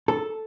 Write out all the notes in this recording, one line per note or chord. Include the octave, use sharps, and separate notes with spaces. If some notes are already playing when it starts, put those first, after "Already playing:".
A4